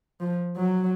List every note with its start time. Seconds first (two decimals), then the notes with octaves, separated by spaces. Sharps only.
0.21 F3
0.57 F#3